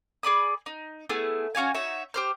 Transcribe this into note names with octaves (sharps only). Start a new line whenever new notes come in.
G#4 D5 B5 D#6
D#4
A3 B3 E4 G#4
C#4 F#4 F5 G#5
D#4 F#4 C#5 E5
G4 C5 F6